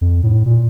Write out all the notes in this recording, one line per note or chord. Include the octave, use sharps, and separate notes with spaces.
F2
A2
A#2